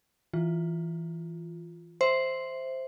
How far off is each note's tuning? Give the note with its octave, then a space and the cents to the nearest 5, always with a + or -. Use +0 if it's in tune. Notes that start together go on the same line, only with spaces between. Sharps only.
E3 +0 F4 +0
C5 +0 E5 +0